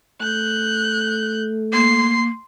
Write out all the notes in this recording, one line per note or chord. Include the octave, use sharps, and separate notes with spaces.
A3 F#6 G6
A#3 C6 C7